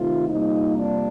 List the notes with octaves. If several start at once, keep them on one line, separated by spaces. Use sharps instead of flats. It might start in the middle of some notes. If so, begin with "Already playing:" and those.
Already playing: C3 D#3 A3 F4
F2 C3 G3 A#3 D#4
D4